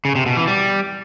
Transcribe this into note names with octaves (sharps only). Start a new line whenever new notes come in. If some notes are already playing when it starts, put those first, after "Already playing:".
C#3
C3
B2
E3
G3